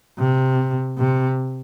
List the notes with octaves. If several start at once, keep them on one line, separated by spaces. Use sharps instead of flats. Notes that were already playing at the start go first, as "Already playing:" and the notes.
C3
C3